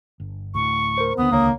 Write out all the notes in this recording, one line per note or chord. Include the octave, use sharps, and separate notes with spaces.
G1
D2 A2 C#6
A#4 C5
D#2 D3 B3 D#6
C#2 A#3 C#5